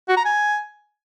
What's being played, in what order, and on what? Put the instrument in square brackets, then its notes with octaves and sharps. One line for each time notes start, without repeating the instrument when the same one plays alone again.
[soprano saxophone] F#4
A#5
G#5